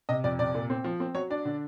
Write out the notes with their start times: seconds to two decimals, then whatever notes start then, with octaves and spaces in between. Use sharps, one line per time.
0.09 C3 D#5
0.24 F2 D5
0.39 C3 D5
0.54 A#2
0.70 C4
0.84 F3
1.00 C4
1.14 F#3 C#5
1.30 D4 D5
1.45 D3